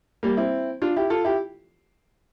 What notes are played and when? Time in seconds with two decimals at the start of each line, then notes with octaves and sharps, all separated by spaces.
0.23 G3 A#3
0.37 C4 E4
0.82 D4 F4
0.96 E4 G4
1.10 F4 A4
1.24 E4 G4